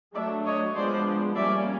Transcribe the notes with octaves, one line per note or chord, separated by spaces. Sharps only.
F#3 A3 D4 D5 E5
C#5 D#5
F3 G#3 B3 D4 C5 D5
G3 A#3 C#4 D5 E5